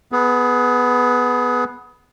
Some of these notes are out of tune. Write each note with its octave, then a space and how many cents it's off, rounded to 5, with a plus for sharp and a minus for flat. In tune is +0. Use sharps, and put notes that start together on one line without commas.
B3 +0 G#4 +20